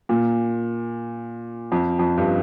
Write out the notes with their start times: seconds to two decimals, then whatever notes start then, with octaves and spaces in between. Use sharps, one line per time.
0.09 A#2
1.72 F2
1.99 F2
2.17 G2